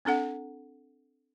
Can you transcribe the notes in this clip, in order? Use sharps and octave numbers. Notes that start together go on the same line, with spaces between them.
C4 D4 A4 F#5